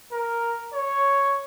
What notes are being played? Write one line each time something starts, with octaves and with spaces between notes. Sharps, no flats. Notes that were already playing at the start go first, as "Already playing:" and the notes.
A#4
C#5